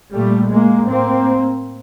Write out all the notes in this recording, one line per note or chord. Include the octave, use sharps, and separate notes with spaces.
A#2 G3 A3
G#3 A#3
A2 A#3 C4